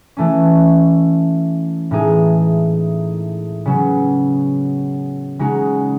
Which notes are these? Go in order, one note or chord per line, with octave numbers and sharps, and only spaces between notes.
E3 A3 C#4
A2 E3 G#3 D#4 G#4
C#3 F#3 B3
C#3 G#3 D#4 F#4